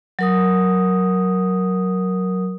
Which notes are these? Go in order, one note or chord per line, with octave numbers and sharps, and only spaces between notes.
F#3 A#4 D#6